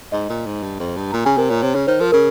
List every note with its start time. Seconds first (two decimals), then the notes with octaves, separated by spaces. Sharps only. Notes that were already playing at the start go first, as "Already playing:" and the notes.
0.12 G#2 D#5
0.29 A#2
0.46 G#2
0.63 G2
0.80 F2
0.96 G2
1.12 A#2 A#5
1.25 C#3 G#5
1.37 C3 A#4
1.50 A#2 C#5
1.62 C3 C#5
1.75 C#3 C#5
1.87 D#3 C5
2.00 F3 A#4
2.12 C#3 A#4